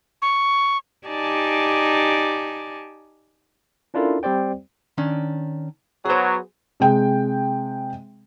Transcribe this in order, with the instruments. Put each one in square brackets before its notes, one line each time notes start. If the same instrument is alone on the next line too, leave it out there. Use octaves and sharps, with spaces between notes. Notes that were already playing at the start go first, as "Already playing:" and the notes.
[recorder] C#6
[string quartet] D#4 G4 D5 G#5 A5
[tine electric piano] C#4 D4 E4 F4 A4 A#4
G3 C4 G4 C5 D5 G5
[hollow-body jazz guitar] D#3 C#4 D4
[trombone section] F#3 B3 [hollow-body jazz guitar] G#4 C5
[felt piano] C3 G#3 G5